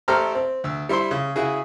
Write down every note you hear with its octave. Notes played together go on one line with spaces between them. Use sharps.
A1 G4 A4 C5 A#5 F6
C4
D2 E6
G3 E4 C5 E5 C6
C#3
C#3 E4 F#4 G#4